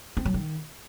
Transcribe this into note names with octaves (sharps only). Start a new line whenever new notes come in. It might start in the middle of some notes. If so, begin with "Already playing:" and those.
C4
F#3
D#3